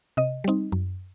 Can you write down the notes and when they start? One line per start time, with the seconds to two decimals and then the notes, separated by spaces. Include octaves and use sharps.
0.17 C3 D#5
0.44 G3 C4 D#4
0.72 F#2